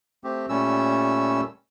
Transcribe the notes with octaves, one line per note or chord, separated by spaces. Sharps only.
A3 C4 G4
A#2 G3 A3 C#4 E6